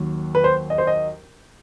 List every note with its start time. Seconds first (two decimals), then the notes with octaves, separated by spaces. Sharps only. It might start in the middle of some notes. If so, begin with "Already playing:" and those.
Already playing: D#2 D#3 F#3
0.35 B4
0.44 C5
0.70 D#5
0.78 C5
0.87 D#5